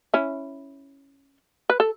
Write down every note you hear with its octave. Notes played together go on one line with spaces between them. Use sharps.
C#4 E4
B4
A4